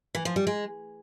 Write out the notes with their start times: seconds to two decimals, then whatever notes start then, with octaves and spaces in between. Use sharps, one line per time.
0.15 E3
0.25 F3
0.36 G3
0.47 G#3